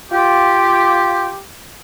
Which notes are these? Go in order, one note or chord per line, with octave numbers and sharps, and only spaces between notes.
F4 G4